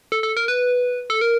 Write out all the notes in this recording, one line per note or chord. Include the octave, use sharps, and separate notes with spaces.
A4
A4
A#4
B4
A4
A#4